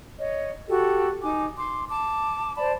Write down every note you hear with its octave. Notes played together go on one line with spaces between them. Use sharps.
C#5 D#5
F#4 G4 A4
D#4 G#5 D6
C6 D6
A5 D6
C5 D5 A5 B5